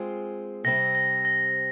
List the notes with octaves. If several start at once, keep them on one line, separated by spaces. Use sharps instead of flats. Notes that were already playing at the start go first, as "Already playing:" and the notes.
Already playing: G#3 C4 F4 G#4
C3 G3 C4 A#6
A#6
A#6